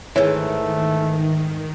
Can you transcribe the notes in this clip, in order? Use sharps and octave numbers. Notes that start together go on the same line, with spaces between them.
G#2 D#3 E3 A3 C#5